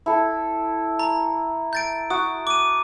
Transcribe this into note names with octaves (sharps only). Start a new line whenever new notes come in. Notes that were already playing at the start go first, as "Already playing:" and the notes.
E4 A4
A#5
G6 A6 D7
F#4 D#6
D6 D#7